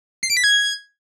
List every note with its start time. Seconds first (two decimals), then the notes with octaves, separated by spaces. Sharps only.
0.23 C7
0.30 D7
0.37 B6
0.44 G#6